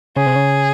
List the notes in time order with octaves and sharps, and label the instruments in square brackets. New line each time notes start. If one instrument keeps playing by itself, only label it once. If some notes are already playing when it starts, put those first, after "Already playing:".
[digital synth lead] C#3 [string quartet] G#4
[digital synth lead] C3
C#3